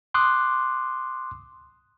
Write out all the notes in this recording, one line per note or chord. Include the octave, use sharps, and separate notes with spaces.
C6 D6 D#6 F#6